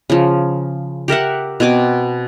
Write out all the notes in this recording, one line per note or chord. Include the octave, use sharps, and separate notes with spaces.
C#3 F3
G4 A#4 E5 F#5
B2 C4 G#5 D6